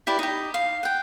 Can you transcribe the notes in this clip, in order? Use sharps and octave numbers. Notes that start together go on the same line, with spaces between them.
E4 G4 B4 D5
D#4 G4
F5
F#5 G5